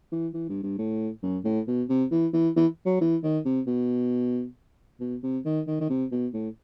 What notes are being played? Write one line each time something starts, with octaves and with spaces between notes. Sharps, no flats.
E3
E3
G2
G2
A2
F#2
A2
B2
C3
E3
E3
E3
F#3
E3
D#3
C3
B2
B2
C3
D#3
D#3
D#3
C3
B2
A2